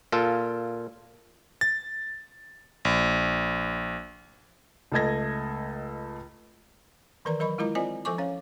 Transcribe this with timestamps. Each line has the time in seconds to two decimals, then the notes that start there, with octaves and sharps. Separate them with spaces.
0.12 A#2 F4 A4
1.61 A6
2.85 A#1
4.92 C#2 A3 A4 D#5 G#6 A#6
7.25 D#3 E3 A#4 B4 D5 A#5
7.40 F#3 A#4 D#5 B5 C#6
7.58 G#3 E4 F4 A#4 D#5 A#5
7.75 C4 F4 C5 D5 D#5 G#5
8.05 F3 A4 C5 G#5 C#6 D6
8.18 C#4 C#5 F5